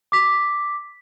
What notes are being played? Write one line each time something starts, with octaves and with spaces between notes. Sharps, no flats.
D6 B6